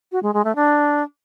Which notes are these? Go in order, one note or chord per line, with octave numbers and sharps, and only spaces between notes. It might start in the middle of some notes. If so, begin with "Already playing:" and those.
F#4
G#3
G#3
A3
D4